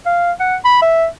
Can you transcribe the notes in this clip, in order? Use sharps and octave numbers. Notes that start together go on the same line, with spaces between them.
F5
F#5
B5
E5